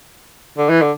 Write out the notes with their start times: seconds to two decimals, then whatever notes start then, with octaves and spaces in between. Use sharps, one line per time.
0.58 D3
0.69 E3
0.82 D3